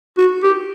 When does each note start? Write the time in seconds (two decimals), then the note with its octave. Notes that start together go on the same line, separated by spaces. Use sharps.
0.18 F#4
0.43 G4